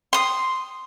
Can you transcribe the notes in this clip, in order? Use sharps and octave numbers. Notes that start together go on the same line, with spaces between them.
C6 D#6